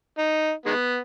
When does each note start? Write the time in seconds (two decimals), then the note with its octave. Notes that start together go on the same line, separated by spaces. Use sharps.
0.18 D#4
0.66 D#3 G#3 B3